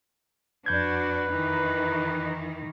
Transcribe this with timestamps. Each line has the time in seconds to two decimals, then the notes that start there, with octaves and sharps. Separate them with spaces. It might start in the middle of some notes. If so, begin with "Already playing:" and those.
0.66 F2 D4 F#4 B4 G6 G#6
1.30 D#3 E3 D#4